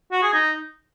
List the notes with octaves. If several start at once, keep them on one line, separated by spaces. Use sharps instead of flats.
F#4
G#4
D#4